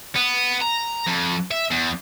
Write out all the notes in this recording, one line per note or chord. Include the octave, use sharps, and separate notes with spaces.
B3
A#5
F2
E5
E2